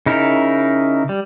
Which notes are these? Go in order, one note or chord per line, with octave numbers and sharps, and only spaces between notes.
C#3 D#4 E4 A#4
G3